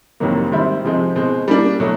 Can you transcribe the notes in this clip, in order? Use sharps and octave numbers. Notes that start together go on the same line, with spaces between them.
F2 C3 D#3 F#3 A#3
G#2 D#3 G3 C4 E4
C3 F3 G#3 C4 D#4
B2 G#3 C4
G3 A#3 D4
B2 F#3 A3